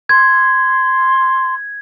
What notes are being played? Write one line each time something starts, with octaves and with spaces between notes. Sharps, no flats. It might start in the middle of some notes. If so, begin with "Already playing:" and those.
C6 G#6